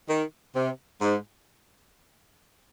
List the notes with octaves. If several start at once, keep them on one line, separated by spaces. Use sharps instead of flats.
D#3
C3
G#2